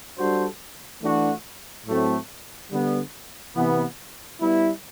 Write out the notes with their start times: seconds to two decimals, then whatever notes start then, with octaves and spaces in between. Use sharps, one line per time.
0.17 G3 D4 F#4 A4 C5
1.02 E3 A3 D4 F#4
1.86 A2 F#3 A3 C4
2.70 D3 G3 B3
3.55 C3 E3 B3
4.39 G3 B3 E4